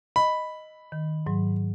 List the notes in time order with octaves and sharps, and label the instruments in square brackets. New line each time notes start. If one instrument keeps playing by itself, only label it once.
[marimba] D#5 [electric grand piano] B5
[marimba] D#3
G#2 F#3